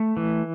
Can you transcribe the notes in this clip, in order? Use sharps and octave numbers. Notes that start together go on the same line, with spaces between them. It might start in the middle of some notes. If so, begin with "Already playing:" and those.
Already playing: A3
E3